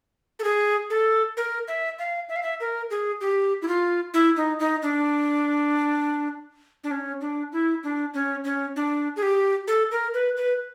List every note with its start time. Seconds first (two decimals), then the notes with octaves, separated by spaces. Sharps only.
0.39 A4
0.44 G#4
0.90 A4
1.37 A#4
1.68 E5
1.99 F5
2.29 E5
2.36 F5
2.43 E5
2.60 A#4
2.90 G#4
3.21 G4
3.62 E4
3.68 F4
4.14 E4
4.37 D#4
4.60 D#4
4.82 D4
6.84 D4
6.91 C#4
7.21 D4
7.52 E4
7.83 D4
8.14 C#4
8.44 C#4
8.76 D4
9.16 G#4
9.23 G4
9.68 A4
9.92 A#4
10.14 B4
10.37 B4